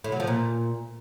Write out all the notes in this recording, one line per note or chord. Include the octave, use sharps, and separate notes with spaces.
A2
F#3
F3
A#2